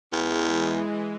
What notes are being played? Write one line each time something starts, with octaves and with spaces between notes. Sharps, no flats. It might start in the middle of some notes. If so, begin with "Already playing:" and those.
E2 E3 G#3